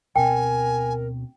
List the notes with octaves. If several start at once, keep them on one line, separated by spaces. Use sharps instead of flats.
D2 B2 C4 A#4 G5 G#5